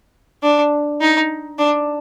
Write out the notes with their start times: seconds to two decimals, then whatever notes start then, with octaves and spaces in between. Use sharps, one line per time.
0.42 D4
1.01 D#4
1.58 D4